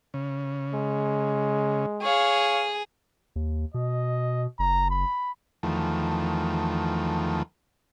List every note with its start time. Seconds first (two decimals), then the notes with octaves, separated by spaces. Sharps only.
0.14 C#3
0.74 G#3
2.02 G#4 C#5 F5
3.36 D#2
3.74 B2 D#5
4.59 F#1 A#5
4.90 B5
5.63 E2 D#3 F3 A3